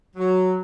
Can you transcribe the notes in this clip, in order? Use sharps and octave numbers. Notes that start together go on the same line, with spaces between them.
F#3